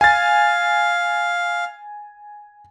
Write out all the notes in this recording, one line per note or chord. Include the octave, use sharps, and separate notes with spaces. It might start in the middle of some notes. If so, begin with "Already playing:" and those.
F5 G#5 A6